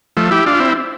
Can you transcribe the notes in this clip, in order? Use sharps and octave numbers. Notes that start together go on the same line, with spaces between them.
F3 A3
E4 G4
D4 F4
C4 E4